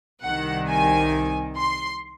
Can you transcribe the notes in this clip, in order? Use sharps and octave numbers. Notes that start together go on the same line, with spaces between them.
C2 C3 D#3 F#5
G#5
C6